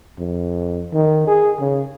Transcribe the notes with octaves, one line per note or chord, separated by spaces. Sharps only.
F2
D#3
G#4
C#3